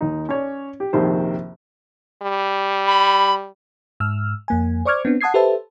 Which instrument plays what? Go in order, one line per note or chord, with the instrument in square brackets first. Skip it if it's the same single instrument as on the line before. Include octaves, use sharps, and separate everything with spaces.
[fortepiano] D#2 D#4
C#4 C#5 D5
G4
A#1 F2 C3 D#3 C5
[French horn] G3
[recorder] B5
[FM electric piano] G#2 E6 F6
F2 A#3 G#5
C5 D5 C#6 D6 F6 G#6
B3 C4 D4
F#5 A5 D#6 G#6 C7
G4 A4 B4 C5 E5 A5